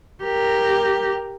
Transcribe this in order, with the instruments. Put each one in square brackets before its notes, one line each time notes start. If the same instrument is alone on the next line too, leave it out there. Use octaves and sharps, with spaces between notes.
[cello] G4 A#4